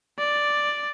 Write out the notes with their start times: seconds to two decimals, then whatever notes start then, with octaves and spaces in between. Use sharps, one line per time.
0.19 D5